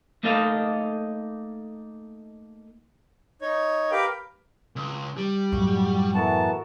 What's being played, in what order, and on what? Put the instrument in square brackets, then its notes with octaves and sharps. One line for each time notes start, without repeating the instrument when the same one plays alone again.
[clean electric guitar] A3 A#3 D#4 A4 D#5 F5
[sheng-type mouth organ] D#4 C#5
G4 A#4 B4 F5 G5
[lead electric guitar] C#2
G3
[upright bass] F#2 A2 [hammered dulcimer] F#4
[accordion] E3 B3 A5 [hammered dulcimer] F#4 A4 A#4